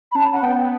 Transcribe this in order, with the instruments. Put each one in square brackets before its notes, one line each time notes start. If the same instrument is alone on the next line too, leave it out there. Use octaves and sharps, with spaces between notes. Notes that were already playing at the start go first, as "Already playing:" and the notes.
[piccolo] B5
[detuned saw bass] C#4 [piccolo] A5
[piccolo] F#5
[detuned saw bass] B3 [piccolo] G5